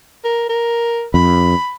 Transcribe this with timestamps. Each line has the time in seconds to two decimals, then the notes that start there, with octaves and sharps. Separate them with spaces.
0.24 A#4
0.49 A#4
1.14 F2 B5